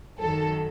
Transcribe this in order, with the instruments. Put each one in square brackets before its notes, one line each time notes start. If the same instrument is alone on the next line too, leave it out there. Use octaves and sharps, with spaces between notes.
[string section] F#2 D#3 F#3 A4